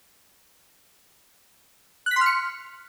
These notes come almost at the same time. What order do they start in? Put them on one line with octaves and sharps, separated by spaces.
F#6 B6 C6 F6 C#7